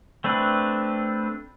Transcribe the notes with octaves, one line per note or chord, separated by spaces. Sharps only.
A3 C4 D4 B4